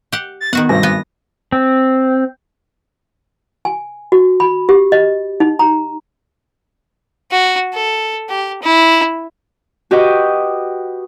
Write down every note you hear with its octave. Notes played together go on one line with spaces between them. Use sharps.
G4 F#5
A6
D#3 B3 F#4 F#5
G#1 G2 G#5 A#6
B3
C4
G#5
F#4
B5
G4
D#5
D#4
A#5
F#4
A4
G4
E4
F#4 G4 B4 D#5 G5